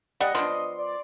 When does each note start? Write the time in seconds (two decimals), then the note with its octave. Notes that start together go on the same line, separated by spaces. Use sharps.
0.20 G3 D#5 F#5
0.35 F3 B3 D4 C6
0.78 D5